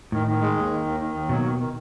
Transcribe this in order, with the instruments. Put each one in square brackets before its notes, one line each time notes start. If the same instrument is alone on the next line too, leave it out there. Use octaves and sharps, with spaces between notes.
[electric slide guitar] A2 [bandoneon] D#3
[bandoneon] D#3
G#3
D#2
D#3
D#2
D#3
D#2
[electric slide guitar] B2 [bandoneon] F#3
[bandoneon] D#3
D#3